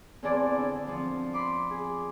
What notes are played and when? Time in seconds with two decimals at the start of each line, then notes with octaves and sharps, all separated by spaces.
0.23 E2 C4 G#4 B4 D5 A5
0.57 D3
0.87 F3 C4
1.33 B5 C6 D6
1.70 G#4